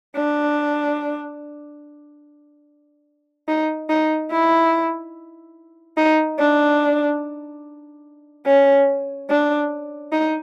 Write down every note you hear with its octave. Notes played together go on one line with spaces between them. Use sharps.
D4
D#4
D#4
E4
D#4
D4
C#4
D4
D#4